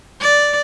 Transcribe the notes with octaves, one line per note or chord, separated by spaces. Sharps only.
D5